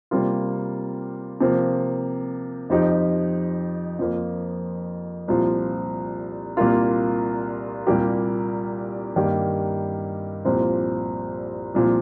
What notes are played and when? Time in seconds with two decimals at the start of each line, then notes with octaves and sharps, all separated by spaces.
0.11 C3 G3 A#3 F4
1.41 C3 F3 A#3
2.70 F2 F3 D#4 G4
3.99 F2 F3 A#3
5.28 C2 A#2 F3
6.57 C2 A#2 A#3 F4
7.87 C2 A#2 G3 A#3 G4
9.16 G2 D#3 A#3 G4
10.45 C2 A#2 F3 C4
11.74 C2 A#2 F3